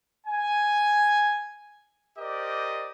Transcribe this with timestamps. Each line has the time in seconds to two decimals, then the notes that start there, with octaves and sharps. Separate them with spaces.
0.27 G#5
2.18 G4 A#4 C5 D5 D#5